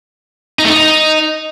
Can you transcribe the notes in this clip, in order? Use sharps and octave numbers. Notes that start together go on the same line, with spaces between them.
D#4
A3
D#4